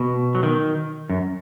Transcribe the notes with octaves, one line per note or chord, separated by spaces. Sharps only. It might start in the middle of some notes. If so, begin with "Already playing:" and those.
Already playing: B2
F#3
D#3
F#2